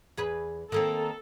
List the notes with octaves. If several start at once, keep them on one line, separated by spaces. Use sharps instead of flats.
E2 G#4 B4
D#3 A#3 C4 A4